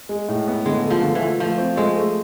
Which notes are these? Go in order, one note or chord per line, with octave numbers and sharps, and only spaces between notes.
G#3
A2
B3
D3 G#3
A3
F3
D3
E3
A3
F3 A3
C4
G#3 A3
A3